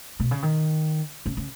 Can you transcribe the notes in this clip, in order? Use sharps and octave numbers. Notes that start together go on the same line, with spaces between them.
B2
C#3
D#3
C#3
C#3